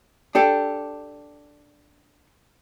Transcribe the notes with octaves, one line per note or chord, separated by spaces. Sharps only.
D4 G4 A4